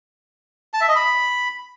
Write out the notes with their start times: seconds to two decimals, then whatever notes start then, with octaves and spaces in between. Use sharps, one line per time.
0.74 A5
0.81 E5
0.88 D#5
0.96 B5